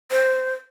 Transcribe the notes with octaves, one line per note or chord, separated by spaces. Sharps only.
C5